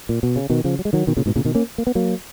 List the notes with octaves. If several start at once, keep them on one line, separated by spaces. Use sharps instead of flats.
A#2
B2
C#3
B2 D#3
C#3 F3
F#3
G#3
D#3 F#3
B2 D#3
A#2 C#3
G#2 B2
A#2 C#3
B2 D#3
A#3 C#4
A#3
B3
F#3 A#3